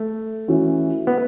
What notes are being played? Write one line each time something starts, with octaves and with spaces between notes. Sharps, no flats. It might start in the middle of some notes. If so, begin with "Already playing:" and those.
Already playing: A3
E3 C#4 F#4
B3